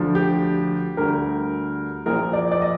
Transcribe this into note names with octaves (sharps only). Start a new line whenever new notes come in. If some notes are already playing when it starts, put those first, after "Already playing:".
Already playing: D2 D3 F3
G4
D2 D3 G3 A#4
A#1 A#2 F3 A#4
D5
D5
D#5